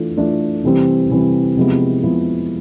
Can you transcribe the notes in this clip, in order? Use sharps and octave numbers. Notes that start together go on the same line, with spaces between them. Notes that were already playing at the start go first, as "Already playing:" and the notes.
Already playing: E3 A3 D4 F4 A4
E3 A3 D4 F4 A4
C3 E3 G3 C4
C3 E3 G3 C4
C3 F3 G#3 B3 E4
C3 F3 G#3 B3 E4